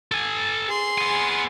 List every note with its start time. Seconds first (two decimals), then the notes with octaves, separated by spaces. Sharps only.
0.12 A4 G#5
0.66 G#4 C6
0.98 B3 G#5